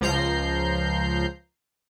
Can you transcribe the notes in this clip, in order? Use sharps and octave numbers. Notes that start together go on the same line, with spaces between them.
C#2 F3 A#5 G6 C7